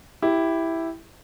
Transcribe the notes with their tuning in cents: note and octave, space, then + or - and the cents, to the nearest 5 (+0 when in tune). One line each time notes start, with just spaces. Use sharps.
E4 +0 G4 +0